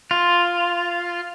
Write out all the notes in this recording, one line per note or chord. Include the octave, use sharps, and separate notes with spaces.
F4